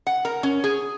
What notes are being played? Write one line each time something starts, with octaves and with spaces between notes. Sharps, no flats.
F#5
A#4
C#4
G#4